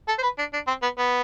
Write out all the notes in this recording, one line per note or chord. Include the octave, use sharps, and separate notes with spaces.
A4
C5
B4
D4
D4
C4
B3
B3